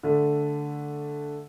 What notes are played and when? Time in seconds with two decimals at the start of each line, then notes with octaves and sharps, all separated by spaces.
0.03 D3 A3